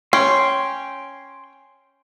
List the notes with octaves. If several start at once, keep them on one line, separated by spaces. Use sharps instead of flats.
C#4 G5 C6